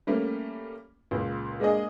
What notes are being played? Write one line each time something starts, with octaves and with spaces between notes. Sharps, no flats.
G3 A3 A#3 C#4
C#2 A#2
G#3 A#3 D4 G#4 D#5